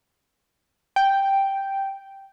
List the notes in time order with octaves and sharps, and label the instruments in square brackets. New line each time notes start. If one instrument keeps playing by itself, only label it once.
[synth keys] G5